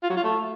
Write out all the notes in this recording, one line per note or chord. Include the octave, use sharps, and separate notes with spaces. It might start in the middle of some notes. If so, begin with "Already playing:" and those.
F4
F#3
F4
A3